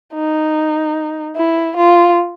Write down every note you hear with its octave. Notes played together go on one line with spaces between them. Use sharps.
D#4
E4
F4